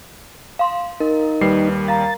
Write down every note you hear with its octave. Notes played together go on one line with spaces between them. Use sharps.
F5 C6
D#4 A#4
D#2 G3 B4 C7
F5 A#5 A6